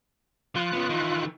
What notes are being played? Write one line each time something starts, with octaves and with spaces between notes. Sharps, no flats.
F3 F4 F#6
C#3 B3
D#3 E3